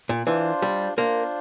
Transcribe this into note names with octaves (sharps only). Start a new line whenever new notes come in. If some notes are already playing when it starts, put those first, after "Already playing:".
A#2
E3 D4 F4 C5
G3
A#3 D4 F4 C5